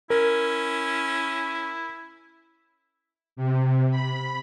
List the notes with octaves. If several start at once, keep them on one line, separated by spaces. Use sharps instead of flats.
C#4 E4 A#4
C3
B5